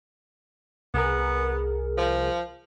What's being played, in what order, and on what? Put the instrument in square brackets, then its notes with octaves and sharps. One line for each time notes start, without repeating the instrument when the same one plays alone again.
[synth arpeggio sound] C2 G#4 A#4 [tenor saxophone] B3
[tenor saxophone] F3